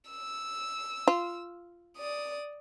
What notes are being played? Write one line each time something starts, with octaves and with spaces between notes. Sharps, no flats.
E6
F4
D5 D#6